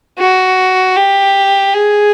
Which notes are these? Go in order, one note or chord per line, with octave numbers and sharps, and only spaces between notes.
F#4
G4
G#4